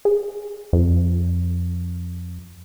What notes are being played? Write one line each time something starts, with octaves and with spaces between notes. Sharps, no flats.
G#4
F2